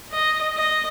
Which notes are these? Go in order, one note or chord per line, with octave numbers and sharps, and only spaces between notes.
D#5
D#5